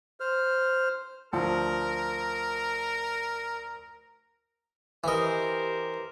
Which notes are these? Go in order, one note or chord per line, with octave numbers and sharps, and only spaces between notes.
C5 F6
D2 F3 A#4
E3 G4 A#4 C5 D#5